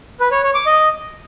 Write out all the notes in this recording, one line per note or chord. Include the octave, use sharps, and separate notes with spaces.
B4
C#5
C#5
D6
D#5